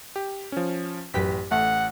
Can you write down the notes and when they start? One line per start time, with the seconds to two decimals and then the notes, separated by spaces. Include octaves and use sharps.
0.16 G4
0.52 F3 C#4
1.14 A1 F#2 G4 B4 B6
1.51 A1 A3 F#5